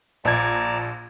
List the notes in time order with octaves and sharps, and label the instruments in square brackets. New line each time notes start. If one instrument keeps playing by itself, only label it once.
[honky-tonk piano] A#1 G#6 [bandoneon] D5 A5 A#5